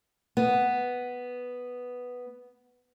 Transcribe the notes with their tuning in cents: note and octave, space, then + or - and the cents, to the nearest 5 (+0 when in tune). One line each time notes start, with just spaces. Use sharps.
B3 +0